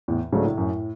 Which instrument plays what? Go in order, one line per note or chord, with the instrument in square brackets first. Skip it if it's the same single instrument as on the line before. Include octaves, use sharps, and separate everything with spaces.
[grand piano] E2 [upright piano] A2
[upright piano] G#2 [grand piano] C#3 F#3 A3 D4
[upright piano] A2
[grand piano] F#2